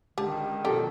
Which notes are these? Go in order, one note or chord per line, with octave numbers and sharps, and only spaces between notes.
C#2 D3 D#3 G4 A5
F#2 B2 F3 G4 A4 G5